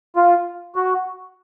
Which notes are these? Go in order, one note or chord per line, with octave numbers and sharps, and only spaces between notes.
F4
F#4